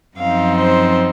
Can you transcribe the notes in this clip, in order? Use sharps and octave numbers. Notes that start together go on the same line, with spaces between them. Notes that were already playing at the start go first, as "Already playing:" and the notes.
F#2 F3 C4 D#4 F5
C5